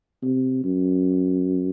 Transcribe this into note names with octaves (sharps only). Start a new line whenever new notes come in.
C3
F#2